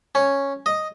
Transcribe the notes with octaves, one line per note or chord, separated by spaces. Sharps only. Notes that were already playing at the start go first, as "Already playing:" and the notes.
C#4
D#5